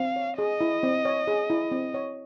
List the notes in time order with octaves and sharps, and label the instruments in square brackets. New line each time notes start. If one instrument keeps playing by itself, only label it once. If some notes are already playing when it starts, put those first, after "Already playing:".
Already playing: [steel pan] C4 [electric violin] F5
[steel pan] C#5
[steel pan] G#4 [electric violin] D#5
[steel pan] E4
C4
C#5
G#4
E4
C4
C#5